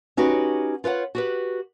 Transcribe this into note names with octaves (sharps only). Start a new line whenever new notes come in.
C#4 D#4 F#4 G4 B4
F4 B4 C#5 F#5
F#4 G4 B4